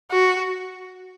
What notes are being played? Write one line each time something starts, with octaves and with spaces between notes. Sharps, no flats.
F#4